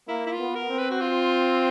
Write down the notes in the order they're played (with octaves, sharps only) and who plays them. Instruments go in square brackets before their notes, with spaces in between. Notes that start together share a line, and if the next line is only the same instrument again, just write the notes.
[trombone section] A#3 [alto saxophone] E4
[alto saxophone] E4
F4
[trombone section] B3
[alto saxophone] A#4
[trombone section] C4
[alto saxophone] B4
F#4
F4